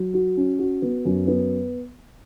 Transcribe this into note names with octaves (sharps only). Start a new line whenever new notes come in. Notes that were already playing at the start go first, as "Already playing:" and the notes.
Already playing: F#3
F#4
C#4
F#4
B3
F#2
B3